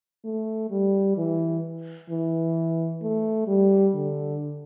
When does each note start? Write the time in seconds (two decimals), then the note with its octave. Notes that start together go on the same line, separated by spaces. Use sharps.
0.25 A3
0.71 G3
1.17 E3
2.10 E3
3.02 A3
3.48 G3
3.94 D3